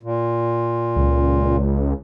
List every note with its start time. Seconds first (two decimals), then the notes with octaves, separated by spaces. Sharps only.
0.03 A#2
0.96 C#2